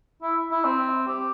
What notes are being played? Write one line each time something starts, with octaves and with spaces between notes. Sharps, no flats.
E4
E4
C4
G4